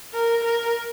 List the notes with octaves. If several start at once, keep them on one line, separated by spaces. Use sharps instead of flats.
A#4
A#4